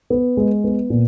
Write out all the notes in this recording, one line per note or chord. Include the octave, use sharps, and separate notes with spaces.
B3
G#3
B3
A#2